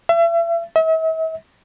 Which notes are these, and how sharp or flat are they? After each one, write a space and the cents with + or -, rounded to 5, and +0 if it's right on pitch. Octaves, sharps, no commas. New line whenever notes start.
E5 +35
E5 -45